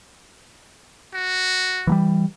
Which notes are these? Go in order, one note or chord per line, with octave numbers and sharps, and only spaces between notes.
F#4
E3 F#3 G3